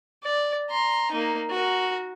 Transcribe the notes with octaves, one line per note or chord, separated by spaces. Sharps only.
D5
A#5 C6
A#3 D#4
F#4 A#4